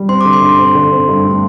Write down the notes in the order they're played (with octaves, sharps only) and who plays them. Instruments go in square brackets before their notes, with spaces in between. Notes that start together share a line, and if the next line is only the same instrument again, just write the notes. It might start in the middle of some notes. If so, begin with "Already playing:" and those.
Already playing: [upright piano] G3
[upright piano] C4 [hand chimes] C6
[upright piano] D3 [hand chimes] D6
[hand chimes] C6
[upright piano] G2
C4
D3
C4
G2
A3